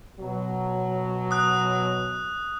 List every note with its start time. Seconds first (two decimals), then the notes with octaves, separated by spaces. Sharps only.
0.19 B2 F#3
1.31 D#6 F#6